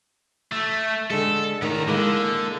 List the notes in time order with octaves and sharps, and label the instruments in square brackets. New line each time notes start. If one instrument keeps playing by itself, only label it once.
[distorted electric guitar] A3
[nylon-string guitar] D3 G#3 [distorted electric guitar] A4
[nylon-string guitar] A2 D#3 [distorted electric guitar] B3 A#5
[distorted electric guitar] D3 [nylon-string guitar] G#3 A#3